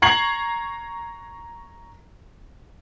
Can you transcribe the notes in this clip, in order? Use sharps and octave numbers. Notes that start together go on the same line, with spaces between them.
A#5 C#6 G#6 C7 F#7